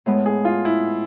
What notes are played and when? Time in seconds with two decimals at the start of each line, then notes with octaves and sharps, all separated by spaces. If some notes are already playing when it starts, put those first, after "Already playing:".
0.06 A2 G#3 B3
0.26 G#4
0.45 F4
0.65 E4